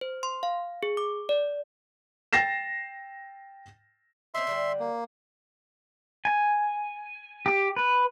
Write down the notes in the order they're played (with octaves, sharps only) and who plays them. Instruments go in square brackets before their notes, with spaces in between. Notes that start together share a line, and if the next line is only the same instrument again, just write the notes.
[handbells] C5
C6
F5
G#4
D6
D5
[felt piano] G5 A6 A#6 C7 E7
[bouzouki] C4 C#4 D#5 [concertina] E5 C6
[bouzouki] D3 D#3 G3
[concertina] A#3
[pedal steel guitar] G#5
G4
B4